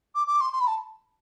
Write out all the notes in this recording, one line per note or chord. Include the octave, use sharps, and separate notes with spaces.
D6
D6
C6
C6
B5
A5